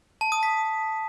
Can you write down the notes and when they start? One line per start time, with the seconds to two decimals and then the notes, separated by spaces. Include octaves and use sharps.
0.21 A5
0.32 D#6
0.43 B6